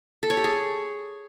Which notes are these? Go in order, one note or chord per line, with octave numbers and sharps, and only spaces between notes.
A4
C#5
G4
G#4